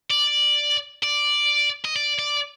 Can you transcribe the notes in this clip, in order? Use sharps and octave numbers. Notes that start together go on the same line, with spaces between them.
D5
D5
D#5
D5
D5